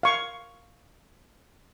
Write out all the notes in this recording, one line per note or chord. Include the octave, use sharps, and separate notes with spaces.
F5 C#6